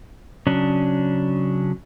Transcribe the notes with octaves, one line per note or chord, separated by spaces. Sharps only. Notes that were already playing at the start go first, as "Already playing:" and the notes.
C#3 F#3 C#4 D4